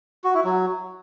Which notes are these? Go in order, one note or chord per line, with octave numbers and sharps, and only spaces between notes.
F#4
E4
F#3